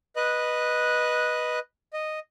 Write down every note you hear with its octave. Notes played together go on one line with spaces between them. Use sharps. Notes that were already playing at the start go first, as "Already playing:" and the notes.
B4 D#5 F#6
D#5